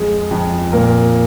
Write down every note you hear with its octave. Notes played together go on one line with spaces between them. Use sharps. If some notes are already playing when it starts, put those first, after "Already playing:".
Already playing: F2 G#3
F2
A#2 A#4